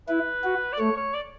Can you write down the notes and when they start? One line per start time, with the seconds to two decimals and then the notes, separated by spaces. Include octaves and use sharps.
0.08 E4 B4
0.44 F#4
0.73 D5
0.79 A3 C#5
0.97 C#5
1.14 D5